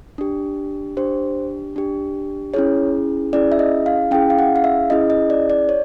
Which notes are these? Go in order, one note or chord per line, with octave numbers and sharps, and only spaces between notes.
D4 G4
D4 G4 C5
D4 G4
C#4 E4 G#4 C#5
C#4 E4 G#4 D5
E5
D#5
F5
C#4 E4 G#4 G5
F5
F#5
F5
E5
C#4 E4 G#4 D#5
D#5
D5
D5
C#5